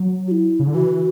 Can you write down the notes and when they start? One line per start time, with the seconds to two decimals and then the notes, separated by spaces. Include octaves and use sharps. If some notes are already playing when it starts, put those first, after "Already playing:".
Already playing: F#3
0.28 F#4
0.31 E4
0.59 C#3
0.67 D3
0.74 E3 F#4